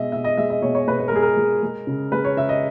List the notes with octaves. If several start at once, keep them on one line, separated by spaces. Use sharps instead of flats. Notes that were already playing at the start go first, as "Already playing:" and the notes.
Already playing: B2 G#3 D#5 E5
B2 E5
D#5
G#3 E5
D#5
B2 C#5
C#5
B2 B4
B4
A#4
G#3 G#4
A#4
G#3
G#3
C#3
G#3 B4
C#5
C#3 E5
D#5